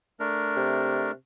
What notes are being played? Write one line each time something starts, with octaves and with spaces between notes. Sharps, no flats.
A3 D4 A#4
C3